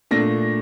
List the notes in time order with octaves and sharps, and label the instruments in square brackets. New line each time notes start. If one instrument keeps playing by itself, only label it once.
[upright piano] A#2 A3 D4 A#6